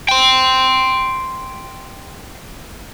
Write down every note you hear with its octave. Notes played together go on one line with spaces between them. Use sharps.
G5 C6